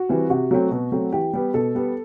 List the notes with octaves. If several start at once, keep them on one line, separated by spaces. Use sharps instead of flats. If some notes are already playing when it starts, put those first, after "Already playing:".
Already playing: F#4
E3 G3 C4
C3 F#4
F#3 A3 C4
B2
F#3 A3 C4
E3 G4
G3 B3
B2 A4
G3 B3